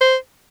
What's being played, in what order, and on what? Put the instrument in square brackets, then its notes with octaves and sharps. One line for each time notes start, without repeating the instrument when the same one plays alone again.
[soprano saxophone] C5